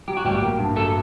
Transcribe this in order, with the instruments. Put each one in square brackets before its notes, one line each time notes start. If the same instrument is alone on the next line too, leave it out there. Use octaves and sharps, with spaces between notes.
[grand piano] F#3 [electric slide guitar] G4
[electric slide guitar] F#4
[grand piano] A1 [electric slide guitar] G3 G4
[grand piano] A#3
G2
[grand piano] F#3 [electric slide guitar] A3 A4